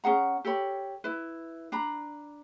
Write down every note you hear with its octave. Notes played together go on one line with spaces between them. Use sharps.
C#4 G#4 F#5 A#5
G4 A4 C#5 B5
E4 B4
D4 A#5 B5